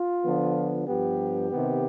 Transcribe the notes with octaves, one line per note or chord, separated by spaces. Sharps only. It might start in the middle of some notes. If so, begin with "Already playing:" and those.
Already playing: F4
D3 F3 B3
G2 F3 B3 G4
C3 D#3 B3